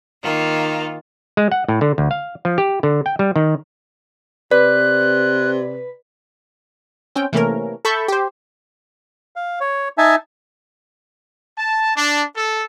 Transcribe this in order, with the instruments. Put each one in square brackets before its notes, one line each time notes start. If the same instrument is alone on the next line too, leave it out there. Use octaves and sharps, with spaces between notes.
[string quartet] D#3 A#3 F4
[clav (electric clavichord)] G#3
F#5
A2
D3
D2
F5
F3
G4
D3
G5
G3
D#3
[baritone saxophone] C3 [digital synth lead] B4 [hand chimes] D5 [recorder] F#6
[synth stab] C4 C#4 G5
C3 E3 A3 A#3 C#4 A#4
A4 E5 A5 B5 C#6 G6
G4 C5
[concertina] F5
C#5
D#4 E5 G#5 A5
[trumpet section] A5
D4
A4